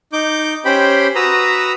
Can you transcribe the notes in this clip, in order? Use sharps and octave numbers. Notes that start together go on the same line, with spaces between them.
D#4 D6 G6
C#4 G4 C5 G5 B5
F#4 B4 A#5 D#6 E6